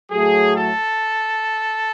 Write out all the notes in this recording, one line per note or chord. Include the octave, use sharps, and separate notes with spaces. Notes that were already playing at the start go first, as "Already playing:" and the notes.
A2 F#3 A3 G#4
A4